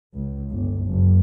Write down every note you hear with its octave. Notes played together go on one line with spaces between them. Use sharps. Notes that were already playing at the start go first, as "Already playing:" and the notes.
C#2
G1
F#1